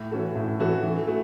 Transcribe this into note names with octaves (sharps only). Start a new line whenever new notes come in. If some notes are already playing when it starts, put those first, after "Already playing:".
Already playing: A2
E3 C#4 F#4 A4
A2
E3 C#4 F#4 A4
E3
A3 F#4